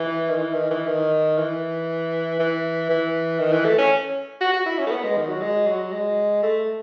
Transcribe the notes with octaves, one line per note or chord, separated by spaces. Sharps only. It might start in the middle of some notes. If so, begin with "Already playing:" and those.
Already playing: E3
D#3
E3
D#3
E3
D#3
E3
E3
E3
D#3
E3
A3
C#4
F#4
F#4
E4
C#4
A3
B3
G#3
D#3
F#3
G#3
F#3
G#3
A3